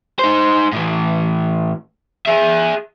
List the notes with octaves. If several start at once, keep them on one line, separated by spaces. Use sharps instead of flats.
D#4 C5
A2 E3
G#4 E5